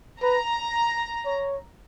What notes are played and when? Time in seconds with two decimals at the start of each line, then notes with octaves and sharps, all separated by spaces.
0.22 B4 A#5
1.25 C#5